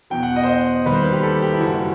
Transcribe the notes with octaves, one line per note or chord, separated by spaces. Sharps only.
E2 B2 F#3 G5
F#5
D#5
C5
D#5
D#2 D#3 G3 B4
C5
B4
G4
A4
G4
E4
F#1 F#2 E3 G3 F#4